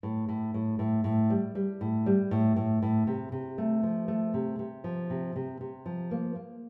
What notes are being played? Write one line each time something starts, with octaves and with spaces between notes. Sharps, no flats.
A2
A2
A2
A2
A2
G3
G3
A2
G3
A2
A2
A2
C3
C3
A3
F3
A3
C3
C3
F3
C3
C3
C3
F3
A#3
A#3